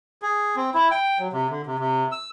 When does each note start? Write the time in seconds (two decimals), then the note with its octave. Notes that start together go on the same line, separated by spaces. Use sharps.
0.22 G#4
0.56 C4
0.74 E4
0.91 G5
1.19 F#3
1.33 C3
1.50 D3
1.66 C3
1.79 C3
2.12 E6